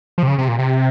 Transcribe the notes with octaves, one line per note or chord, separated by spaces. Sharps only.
F3
C3
C#3
C3
A#2
C3